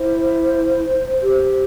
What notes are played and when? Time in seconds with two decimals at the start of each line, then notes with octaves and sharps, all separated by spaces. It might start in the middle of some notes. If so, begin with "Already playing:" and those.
Already playing: E4 C5
1.22 G4